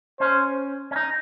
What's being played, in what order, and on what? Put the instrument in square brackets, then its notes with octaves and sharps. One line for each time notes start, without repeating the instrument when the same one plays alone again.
[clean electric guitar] C#4 [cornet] C5
[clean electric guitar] C#4
D#4